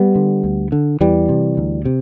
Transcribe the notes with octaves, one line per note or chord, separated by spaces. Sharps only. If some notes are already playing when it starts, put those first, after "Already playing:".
Already playing: G3 B3
D3
D2
D3
E2 E3 G3
C3
D2
C3